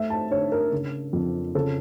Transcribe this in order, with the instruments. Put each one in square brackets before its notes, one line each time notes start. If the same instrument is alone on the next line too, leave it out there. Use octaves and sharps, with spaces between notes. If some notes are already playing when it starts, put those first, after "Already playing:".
Already playing: [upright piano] A3 E5
A5
D3 C#5
A#4
C#3
F2
C#3 A4